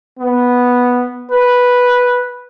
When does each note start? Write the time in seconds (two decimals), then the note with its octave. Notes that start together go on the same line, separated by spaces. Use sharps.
0.19 B3
1.31 B4